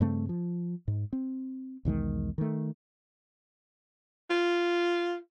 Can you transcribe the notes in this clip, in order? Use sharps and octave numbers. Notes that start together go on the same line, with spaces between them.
G2 C#3 A3 C4
F3
G#2
C4
B1 E2 D#3 G#3
D#3 A3
F4